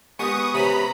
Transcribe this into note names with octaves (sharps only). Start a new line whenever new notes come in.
G#3 B3 G4 B4 C#6 D#6
C3 C#4 B4 A#5 B5